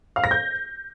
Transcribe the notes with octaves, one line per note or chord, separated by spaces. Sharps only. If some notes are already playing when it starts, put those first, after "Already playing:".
F5
A#6
G6